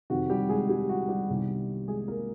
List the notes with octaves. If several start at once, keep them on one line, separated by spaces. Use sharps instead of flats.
F2 C3 D#3 F#4
G3 G4
G#3 G#4
G3 G4
F#4
G3 G4
C2 C3 D#3 G3 B3
G#3 G#4
A#3 A#4